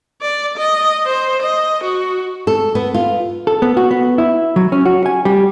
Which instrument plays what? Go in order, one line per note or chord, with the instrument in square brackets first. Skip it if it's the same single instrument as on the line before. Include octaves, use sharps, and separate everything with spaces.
[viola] D5
D#5
C5
D#5
F#4
[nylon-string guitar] A4
B3
F4
[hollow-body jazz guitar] A4
B3
F#4
B3
E4
F#3
C#4
F#4
G#5
G3